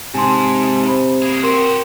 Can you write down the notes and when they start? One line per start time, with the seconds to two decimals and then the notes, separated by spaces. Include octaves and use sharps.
0.14 G#2 C3 G#5 A5 C6
0.85 C5 B5
1.22 A#3 G#4
1.43 F#4 G4 A#4 C6